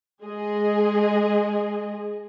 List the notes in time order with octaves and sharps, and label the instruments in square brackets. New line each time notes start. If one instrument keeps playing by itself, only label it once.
[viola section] G#3 G#4 D#5